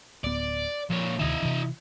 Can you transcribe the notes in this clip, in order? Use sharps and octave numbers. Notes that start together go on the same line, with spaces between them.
D1 B3 D5
A#2 F3 C#5
D2 C3 D#3 E4 D#5
C3 E3